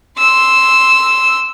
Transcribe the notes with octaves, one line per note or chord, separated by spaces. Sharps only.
C6 E6